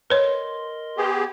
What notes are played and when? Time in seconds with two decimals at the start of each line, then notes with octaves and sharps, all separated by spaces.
0.10 A#4 B4 C#5 D#5 C6
0.97 B3 G4 G#4